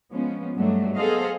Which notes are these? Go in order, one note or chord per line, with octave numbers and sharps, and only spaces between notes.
F3 G#3 B3 C#4
G2 F#3 G#3 A3 D4
B3 G#4 A4 C5 D#5 F5